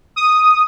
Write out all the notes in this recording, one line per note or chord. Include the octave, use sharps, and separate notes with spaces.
D#6